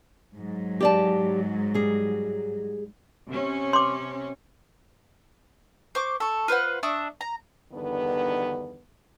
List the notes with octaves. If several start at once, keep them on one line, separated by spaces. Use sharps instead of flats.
G#2 F#3
G4 D5 A5
G3 G#4
C3 C#4
C6 D6
C5 C#6 D6
A4 C#6
F4 B4 C5 F#5
D4 E5 C#6 D#6
A#5
E2 G2 D3 D#3 B3